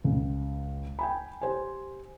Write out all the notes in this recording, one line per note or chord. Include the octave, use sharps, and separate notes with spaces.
C#2
G5 G#5 B5
G4 C5 G#5